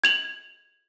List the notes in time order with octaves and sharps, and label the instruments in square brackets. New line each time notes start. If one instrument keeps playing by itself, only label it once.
[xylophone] G#6 F7 F#7